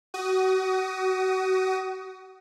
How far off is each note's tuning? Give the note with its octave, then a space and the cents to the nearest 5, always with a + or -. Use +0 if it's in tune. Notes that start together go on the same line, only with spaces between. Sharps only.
F#4 +30 D#6 +0